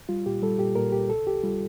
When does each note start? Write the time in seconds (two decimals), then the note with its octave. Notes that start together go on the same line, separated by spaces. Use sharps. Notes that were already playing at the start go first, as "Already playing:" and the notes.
0.09 G3 F4
0.26 A#2 G4
0.42 G3 A4
0.59 A#2 G4
0.75 A#2 A#4
0.92 C2 G4
1.09 C2 A4
1.27 C2 G4
1.43 G3 F4